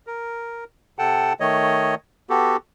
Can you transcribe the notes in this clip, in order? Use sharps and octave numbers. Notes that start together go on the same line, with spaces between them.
A#4
C3 A4 F#5 G5 A5
D#3 A3 C#5 D#5
B3 F#4 G4 A4